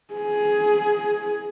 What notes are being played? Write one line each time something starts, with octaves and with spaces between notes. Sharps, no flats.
G#4